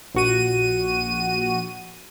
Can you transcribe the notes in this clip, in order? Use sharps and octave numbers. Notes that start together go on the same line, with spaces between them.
A#1 F#4 D#7